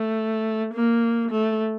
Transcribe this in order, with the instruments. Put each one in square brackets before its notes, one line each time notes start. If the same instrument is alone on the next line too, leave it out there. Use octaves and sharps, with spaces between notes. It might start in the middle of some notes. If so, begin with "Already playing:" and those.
Already playing: [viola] A3
A#3
A3